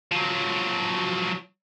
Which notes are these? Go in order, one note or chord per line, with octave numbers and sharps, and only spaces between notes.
F3 F#3